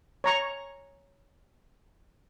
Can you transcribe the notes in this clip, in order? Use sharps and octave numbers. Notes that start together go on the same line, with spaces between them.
C#5 A#5 C#6